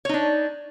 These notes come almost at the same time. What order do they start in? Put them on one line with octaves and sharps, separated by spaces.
C#5 D#4 D4